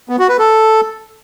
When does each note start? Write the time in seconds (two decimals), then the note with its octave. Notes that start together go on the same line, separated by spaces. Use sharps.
0.09 B3
0.19 F#4
0.29 B4
0.39 A4